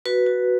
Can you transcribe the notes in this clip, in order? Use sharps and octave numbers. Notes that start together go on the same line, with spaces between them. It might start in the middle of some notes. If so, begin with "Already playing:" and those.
F#4 B4
F#4